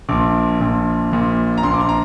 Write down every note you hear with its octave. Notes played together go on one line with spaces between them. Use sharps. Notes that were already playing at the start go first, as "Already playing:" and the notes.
A#1 A#2 D6
A#1 A#2
A#1 A#2
A#5
A#1 A#2 C6
D6
C6
A#5